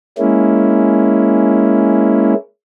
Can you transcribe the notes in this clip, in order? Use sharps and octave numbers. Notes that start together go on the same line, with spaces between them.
G#3 A#3 C#4 E4